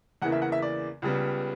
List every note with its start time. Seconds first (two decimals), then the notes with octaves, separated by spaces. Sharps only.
0.22 E2 C#3 E3 A#3 F#5
0.32 E5
0.42 F#5
0.52 E5
0.62 D5
1.02 C#2 C#3 G3 B3